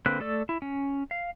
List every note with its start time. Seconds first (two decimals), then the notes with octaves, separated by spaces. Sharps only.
0.06 D3 A#3 C4 B4 F#6
0.20 A3 A4 D5 E6
0.49 E4
0.62 C#4
1.11 F5